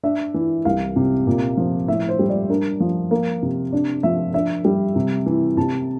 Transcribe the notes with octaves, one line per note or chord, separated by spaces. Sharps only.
D4 E5
E3
C2 F5
C3
A#2
F3
A2 E5
C5
G3
D5
D4 A#4
F3
A#3
C3
D4
F3 E5
D4 E5
G3
C3
E3
C3 A5